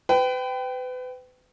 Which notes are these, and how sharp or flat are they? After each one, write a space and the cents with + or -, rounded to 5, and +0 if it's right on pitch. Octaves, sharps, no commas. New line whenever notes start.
B4 +35 G5 -10